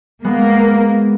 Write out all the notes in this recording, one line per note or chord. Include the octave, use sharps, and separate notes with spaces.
G#3 A#3 B3